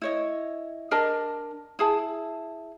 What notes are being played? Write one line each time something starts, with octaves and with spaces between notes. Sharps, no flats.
E4 C#5 D#5
D4 A#4 D#5 A5
E4 G#4 A5